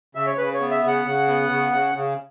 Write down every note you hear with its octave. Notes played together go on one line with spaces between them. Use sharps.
C#3 E5
C#5
C#3 B4
C#5
B3
E5
C#3
F#5
C#3
B3
C#3
C#3
C#3